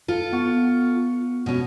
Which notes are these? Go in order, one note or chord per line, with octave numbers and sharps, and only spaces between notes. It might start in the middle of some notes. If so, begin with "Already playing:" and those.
F4 A4
B3 F#5 C#6
B2 C#4